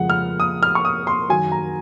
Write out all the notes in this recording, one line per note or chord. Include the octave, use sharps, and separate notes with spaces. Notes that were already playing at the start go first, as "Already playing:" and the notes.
Already playing: F2 C#3 F3 G#3 F#5
F6
D#6
F6
C#6
D#6
C6
F#2 D#3 F#3 G#5
A#5